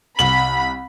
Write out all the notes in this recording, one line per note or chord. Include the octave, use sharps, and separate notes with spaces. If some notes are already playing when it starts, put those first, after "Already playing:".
C2 B5 F#7